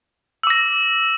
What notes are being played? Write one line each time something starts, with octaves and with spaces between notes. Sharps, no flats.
D6 E6 A#6